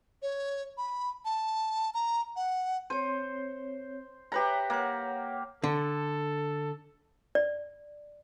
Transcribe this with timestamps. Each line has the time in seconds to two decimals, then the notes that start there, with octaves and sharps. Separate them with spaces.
0.22 C#5
0.78 B5
1.25 A5
1.94 A#5
2.36 F#5
2.90 C4 C5 C#5
4.32 G4 B4 C#5 E5 A#5
4.70 A#3 C#5 F#5
5.64 D3 A4
7.35 D5